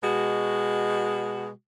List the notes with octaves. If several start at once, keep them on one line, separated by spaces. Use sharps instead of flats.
B2 G#3 F#4